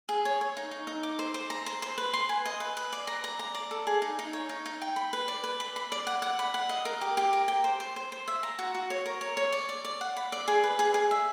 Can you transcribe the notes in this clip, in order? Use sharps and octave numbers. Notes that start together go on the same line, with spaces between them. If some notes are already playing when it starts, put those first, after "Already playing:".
G#4
C#5
C#5
D#4
D#4
D#4
D6
C5
C5
A#5
C5
C5
B4
C6
G#5
D#5
B4
B4
D5
A#5
A#5
A#5
D5
A4
G#4
D#4
D#4
C#5
D#4
D#4
G5
B5
B4
D5
B4
B5
B5
D5
F#5
F#5
B5
F#5
D#5
A#4
G4
G4
A#4
G5
C5
C5
C5
C5
E5
A#5
F#4
F#4
C#5
A#4
C#5
C#5
D5
D5
D5
F#5
B5
D5
G#4
B4
G#4
G#4
E5